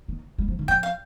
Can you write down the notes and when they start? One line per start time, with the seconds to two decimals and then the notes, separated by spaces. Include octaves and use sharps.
0.08 D#3
0.38 G3
0.48 F3
0.59 D#3
0.68 F3 G5
0.83 F5